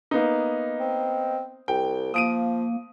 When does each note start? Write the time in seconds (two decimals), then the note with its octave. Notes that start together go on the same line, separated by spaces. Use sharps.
0.11 A#3 B3 D#4
0.80 C4
1.68 C2 G5
2.14 F3 A#3 D#6 D7 D#7